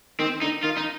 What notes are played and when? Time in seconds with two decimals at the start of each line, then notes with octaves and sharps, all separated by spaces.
0.19 D#3 C4
0.42 D3 D#4
0.63 D#3 F4
0.78 D#4